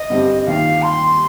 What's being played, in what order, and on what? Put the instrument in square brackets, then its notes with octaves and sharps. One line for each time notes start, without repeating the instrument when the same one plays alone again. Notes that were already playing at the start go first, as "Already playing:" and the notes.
Already playing: [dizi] D#5
[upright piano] G2 D3 G3 C4
[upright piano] D#2 D#3 A#3 F4 [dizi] F5
[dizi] C6